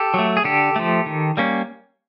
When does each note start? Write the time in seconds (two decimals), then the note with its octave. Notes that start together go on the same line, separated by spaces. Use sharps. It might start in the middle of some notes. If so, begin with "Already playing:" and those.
Already playing: G4 A4
0.14 F#3 A3
0.37 G#4
0.44 D3 G4 A4
0.76 F3 A3
1.06 D#3
1.37 G3 A#3 C#4